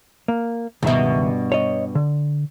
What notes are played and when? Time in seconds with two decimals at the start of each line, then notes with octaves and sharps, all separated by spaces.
0.28 A#3
0.83 C#2 G2 B2 D#3 E5
1.52 C#5 D#5
1.95 D3